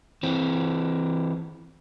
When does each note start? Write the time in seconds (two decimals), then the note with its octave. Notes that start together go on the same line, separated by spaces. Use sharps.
0.23 E3 C4